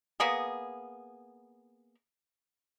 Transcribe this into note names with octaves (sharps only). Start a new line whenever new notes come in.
A#3 B3 G#4